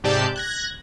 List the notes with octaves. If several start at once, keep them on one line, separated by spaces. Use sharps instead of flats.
G#2 C3 G4 D5 A5 G6
F#6 G#6 A#6